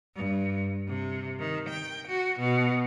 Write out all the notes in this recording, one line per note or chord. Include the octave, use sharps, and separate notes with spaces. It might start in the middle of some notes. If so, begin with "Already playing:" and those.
G2
C3
D#3
G5
F#4
B2